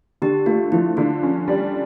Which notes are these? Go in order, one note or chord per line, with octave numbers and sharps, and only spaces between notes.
D3 G4
A3 F4
F3 E4
D3 F4
C#4
G3